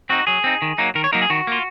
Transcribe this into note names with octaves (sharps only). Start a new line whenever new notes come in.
C4 D#4 F#4
F#3 G#4
C4 D#4
D#3
F#3 A#3 D#4
D#3 A#4
C#5
F#3 A#3 D#4 A#4
G#4
D#3 F#4
A#3 F4